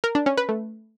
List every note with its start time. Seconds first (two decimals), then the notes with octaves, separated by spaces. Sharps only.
0.04 A#4
0.15 D4
0.26 C#4
0.37 B4
0.49 A3